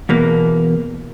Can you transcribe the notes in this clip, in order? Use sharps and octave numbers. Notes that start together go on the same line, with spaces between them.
E2 B2 A#3